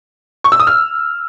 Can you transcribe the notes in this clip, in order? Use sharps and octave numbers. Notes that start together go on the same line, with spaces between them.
C#6
E6
D#6
F6